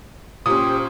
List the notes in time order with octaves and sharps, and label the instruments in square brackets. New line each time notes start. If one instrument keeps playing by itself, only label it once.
[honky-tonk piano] A#2 C#4 [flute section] G4 C5 [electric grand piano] D#6